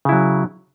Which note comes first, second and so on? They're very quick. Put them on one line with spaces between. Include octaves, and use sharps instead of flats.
C#3 E4 F#3